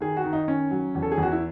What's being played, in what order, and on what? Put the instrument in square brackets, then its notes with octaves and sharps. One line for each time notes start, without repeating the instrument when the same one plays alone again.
[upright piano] D#3 G#4
F#4
D#3
D#4
D#3 C#4
F#3
E2
A4
G#4
E2 F#4
E4